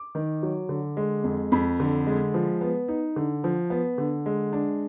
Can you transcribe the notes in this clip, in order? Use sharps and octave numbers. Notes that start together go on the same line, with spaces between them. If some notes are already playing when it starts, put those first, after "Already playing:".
Already playing: D6
D#3
F#3
D3
G#3
F2
F2 B5
D3
G#3
F3
B3
D#4
D3
F3
B3
D3
G#3
D4